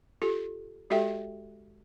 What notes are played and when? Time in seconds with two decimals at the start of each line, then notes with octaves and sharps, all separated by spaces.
0.22 F4 G4 A4
0.90 G#3 F#4 G4 A4 E5 G5